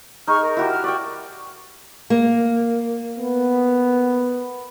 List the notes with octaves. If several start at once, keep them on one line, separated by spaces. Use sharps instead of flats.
D#4 G#4 C#6 F6
A#4
E4 F#4 G4
F6
D5 G5 C#6
A#3
B3